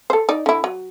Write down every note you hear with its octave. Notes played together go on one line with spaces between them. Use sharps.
A4 C5
D#4 D5
D3 E4
F#3